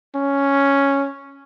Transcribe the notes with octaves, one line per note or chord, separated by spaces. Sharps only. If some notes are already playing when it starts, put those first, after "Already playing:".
C#4